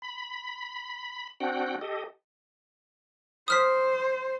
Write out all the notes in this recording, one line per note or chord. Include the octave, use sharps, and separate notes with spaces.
B5
C4 D4 F#4 F#5 G5
G4 A4 D#5
C5 D#6 F6 B6